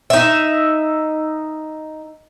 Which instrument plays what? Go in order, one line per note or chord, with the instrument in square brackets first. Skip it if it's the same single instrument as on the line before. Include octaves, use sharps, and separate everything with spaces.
[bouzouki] D#4 E5